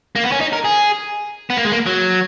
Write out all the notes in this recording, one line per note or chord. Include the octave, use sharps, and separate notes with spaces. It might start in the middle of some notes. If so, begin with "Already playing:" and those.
A#3
B3
C#4
D#4
A#4
G#4
B3
A#3
G#3
A#3
F#3